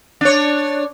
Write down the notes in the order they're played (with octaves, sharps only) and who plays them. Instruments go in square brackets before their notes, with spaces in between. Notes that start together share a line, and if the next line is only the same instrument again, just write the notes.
[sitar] D4 C#5